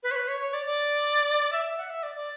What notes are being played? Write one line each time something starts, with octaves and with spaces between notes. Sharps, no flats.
B4
C#5
B4
C#5
C#5
D5
D5
E5
E5
F#5
E5
D5
D5